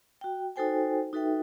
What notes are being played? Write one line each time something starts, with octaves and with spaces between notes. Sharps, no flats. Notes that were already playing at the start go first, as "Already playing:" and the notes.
F#4 G5
D#4 F#4 A4 C5 G5 G#5
D#4 F#4 A4 B4 E5 G5